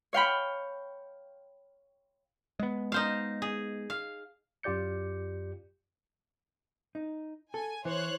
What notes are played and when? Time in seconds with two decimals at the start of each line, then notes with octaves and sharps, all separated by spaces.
0.13 C#5 F5 G5 B5
2.59 G#3 B3
2.92 D#4 C5 F5
3.42 G#4
3.90 F5
4.63 F#2 F4 G4 D5 G6 C#7
6.95 D#4
7.54 A4 G#5
7.85 E3 C5 C#5 F#6